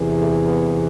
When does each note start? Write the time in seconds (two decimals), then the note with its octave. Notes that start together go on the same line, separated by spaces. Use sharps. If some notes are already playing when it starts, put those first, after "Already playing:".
Already playing: E2 C3 E3
0.18 A3
0.44 B3